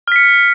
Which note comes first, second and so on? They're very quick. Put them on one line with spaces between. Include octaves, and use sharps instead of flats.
F6 B6 C#7